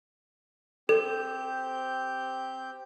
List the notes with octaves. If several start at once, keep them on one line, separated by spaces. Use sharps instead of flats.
C4 G4 A4 G6